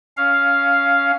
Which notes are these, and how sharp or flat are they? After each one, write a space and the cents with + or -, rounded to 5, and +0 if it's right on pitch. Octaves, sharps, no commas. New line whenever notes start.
C#4 +15 F5 +0